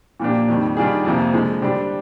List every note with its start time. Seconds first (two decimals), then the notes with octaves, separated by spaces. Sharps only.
0.20 A#2 F3 A#3 D4 G4
0.49 F2 D#3 G3
0.77 D#3 G3 D4 F4 G#4
1.05 F2 C3 F3 A#3
1.34 D3 F3 G#3
1.62 D3 G3 D4 G4 C5